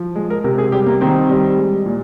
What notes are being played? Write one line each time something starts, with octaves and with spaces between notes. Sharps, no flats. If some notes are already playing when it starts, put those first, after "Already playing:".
Already playing: F3
G#3
A#4
C3 A#4
G#4
G3 G4
A#3
D#3 C4
G3
G#3
A#2